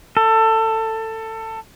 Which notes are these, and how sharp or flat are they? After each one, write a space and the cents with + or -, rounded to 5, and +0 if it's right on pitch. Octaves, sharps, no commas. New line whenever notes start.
A4 +20